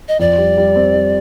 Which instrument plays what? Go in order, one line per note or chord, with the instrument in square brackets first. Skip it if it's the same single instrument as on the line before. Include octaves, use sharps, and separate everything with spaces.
[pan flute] D#5
[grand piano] F2 [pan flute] D5
[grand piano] G3
G3
C4
G3